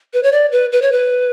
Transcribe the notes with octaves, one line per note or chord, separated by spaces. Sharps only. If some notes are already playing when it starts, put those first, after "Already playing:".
B4
C#5
D5
B4
B4
C#5
B4